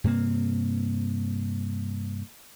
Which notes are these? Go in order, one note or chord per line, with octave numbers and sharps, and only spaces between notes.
G2 C3 A#3 C4